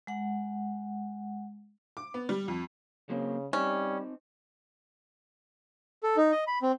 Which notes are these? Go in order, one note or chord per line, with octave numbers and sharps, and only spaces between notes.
G#3 F#5
D6
B3
G3
F2
C#3 F#3 A#3 C4
G3 C4 C#4 D#4
A4
D#4
D#5
B5
C4